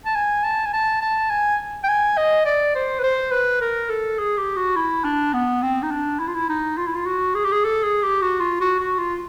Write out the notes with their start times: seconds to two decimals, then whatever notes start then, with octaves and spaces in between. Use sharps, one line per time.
0.05 A5
0.15 G#5
0.44 A5
0.66 G#5
0.73 A5
1.01 A5
1.30 G#5
1.84 G5
1.88 G#5
2.17 D#5
2.45 D5
2.75 C5
2.99 B4
3.03 C5
3.32 B4
3.61 A#4
3.89 A4
4.19 G#4
4.38 G4
4.56 F#4
4.76 E4
5.04 D4
5.34 B3
5.62 C4
5.83 D#4
5.91 D4
6.19 E4
6.28 F4
6.34 E4
6.49 D#4
6.78 F4
6.87 E4
6.95 F4
7.06 F#4
7.35 G#4
7.44 G4
7.52 G#4
7.65 A4
7.83 G#4
8.03 G4
8.22 F#4
8.40 F4
8.61 F#4
8.79 F#4
8.99 F4